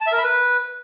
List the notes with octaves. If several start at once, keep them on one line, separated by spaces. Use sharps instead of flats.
A5
E5
A#4
B5
B4